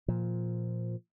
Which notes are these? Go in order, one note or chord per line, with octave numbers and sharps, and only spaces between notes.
A#2 F3